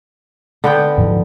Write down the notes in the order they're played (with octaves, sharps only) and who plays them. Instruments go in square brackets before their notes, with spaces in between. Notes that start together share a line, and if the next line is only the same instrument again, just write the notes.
[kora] D3 B3 G5
[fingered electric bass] G#2 F3